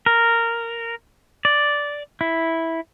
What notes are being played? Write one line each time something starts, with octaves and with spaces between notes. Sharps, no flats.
A#4
D5
E4